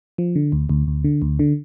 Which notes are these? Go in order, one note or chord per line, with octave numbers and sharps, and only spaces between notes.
F3
D3
D2
D2
D2
D3
D2
D3